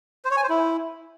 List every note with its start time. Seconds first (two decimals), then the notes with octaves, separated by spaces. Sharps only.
0.25 C5
0.31 C#5
0.37 G#5
0.43 C5
0.49 E4